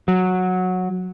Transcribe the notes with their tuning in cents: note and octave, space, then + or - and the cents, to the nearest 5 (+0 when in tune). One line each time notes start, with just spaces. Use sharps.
F#3 -10